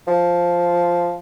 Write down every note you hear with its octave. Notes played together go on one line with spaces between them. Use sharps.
F3